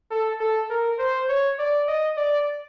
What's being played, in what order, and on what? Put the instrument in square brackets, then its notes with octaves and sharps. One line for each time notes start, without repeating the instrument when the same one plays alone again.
[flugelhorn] A4
A4
A#4
C5
C#5
D5
D#5
D5